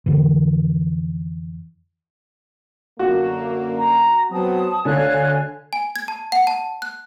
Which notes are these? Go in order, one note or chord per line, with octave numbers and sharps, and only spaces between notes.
F2 D3 E3
F#2 D3 A#3 F#4
A#5
F#3 B3 C4 A5 D#6
D2 D3 C#5 F5 G#5 F#6
G#5
G#6
A5
F#5
A5
F#6